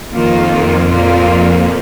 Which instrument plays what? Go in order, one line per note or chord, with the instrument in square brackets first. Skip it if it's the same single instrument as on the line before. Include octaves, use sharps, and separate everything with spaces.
[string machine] F2 [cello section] D#3 A#3 F4
[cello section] A#2 A#3 F4